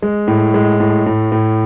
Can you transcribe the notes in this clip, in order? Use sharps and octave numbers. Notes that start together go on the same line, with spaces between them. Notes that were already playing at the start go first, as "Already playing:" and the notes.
G#3
A2
G#3
A2
A2
A2